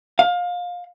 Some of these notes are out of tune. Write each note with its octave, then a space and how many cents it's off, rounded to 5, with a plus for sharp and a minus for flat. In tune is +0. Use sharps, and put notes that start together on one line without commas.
F5 +25